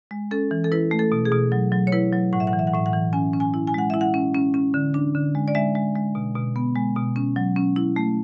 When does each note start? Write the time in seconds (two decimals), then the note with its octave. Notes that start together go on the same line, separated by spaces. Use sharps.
0.11 G#3
0.31 C#4 A4
0.51 E3
0.64 A4
0.72 E4 B4
0.91 A3
0.99 A4
1.12 B2
1.26 G#4
1.32 B2
1.52 F#3
1.72 F#3
1.87 C#5
1.92 E4 B4
2.13 F#3
2.33 A2 F#5
2.40 E5
2.47 F#5
2.53 E3
2.59 E5
2.67 F#5
2.73 A2 E5
2.86 F#5
2.93 E3
3.13 C#4 G#5
3.33 C#4
3.40 G#5
3.54 E4
3.67 G#5
3.74 G#3 F#5
3.90 E4 E5
4.01 F#5
4.14 C#4
4.35 C#4
4.54 C#4
4.74 D3
4.94 D4
5.15 D3
5.35 G#3
5.48 D5
5.55 G#3 E5
5.75 G#3
5.95 G#3
6.15 B2
6.35 B2
6.56 B3
6.75 G#3
6.96 B2
7.16 C#4
7.36 F#3
7.56 C#4
7.76 E4
7.96 A3